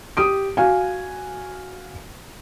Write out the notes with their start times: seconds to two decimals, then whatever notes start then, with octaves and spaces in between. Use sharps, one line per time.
0.17 G4 D#6 D7
0.57 F#4 F5 G#5